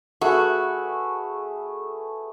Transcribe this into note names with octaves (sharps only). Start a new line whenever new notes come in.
A3 F#4 G#4 B4